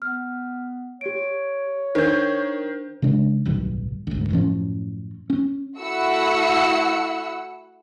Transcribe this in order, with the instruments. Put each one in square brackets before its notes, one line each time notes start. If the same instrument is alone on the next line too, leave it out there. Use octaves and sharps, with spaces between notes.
[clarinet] B3 [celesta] F6
[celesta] G4 D7 [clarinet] C#5
[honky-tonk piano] D#3 G6 [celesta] D4 C5
[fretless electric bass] C#3 G#3 D4
D1 B1 G2 D#3
G#1 D2
F#2 A2 F3 C#4
C#4
[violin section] A3 E4 F#4 F#5 E6 C#7